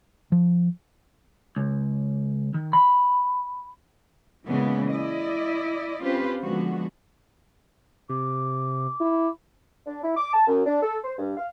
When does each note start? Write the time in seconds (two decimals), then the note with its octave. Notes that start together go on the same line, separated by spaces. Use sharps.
0.32 F3
1.56 C#2
2.54 D#3
2.73 B5
4.46 A#2 C#3 E3 G#3 B3
4.92 E4 D5 D#5
6.01 C4 C#4 F4 G4 B4 C5
6.39 D3 F3 G#3 B3 F#4
8.09 C3 D6
9.00 E4
9.86 D4
10.03 E4
10.16 D6
10.32 A5
10.48 F#2
10.65 D4
10.81 A4
11.04 C5
11.19 G2
11.37 F5